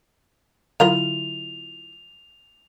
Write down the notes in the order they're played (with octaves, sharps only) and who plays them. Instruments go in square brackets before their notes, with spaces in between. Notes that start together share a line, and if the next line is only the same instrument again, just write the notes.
[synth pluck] D3 F#3 F4 [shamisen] E4 A#4 F5 [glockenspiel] F7